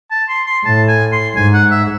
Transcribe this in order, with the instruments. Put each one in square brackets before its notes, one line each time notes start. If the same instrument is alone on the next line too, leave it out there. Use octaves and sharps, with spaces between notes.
[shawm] A5
C6
C6
[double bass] A2 [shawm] A5
[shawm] G#5
C6
[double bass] G#2 [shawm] G#5
[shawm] F#5
E5